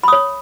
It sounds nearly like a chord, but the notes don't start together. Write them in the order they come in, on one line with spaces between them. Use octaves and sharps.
B5 D#6 C#5